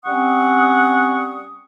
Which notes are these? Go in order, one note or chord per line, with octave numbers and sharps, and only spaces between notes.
G3 C4 C#4 F#5 C#6 D#6